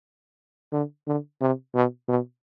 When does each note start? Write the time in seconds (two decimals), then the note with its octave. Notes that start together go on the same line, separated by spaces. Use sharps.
0.72 D3
1.07 D3
1.41 C3
1.74 B2
2.08 B2